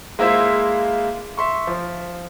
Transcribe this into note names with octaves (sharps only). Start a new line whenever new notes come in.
G#3 A#3 E4 F4 C5 E5
E5 C6 C#6
F3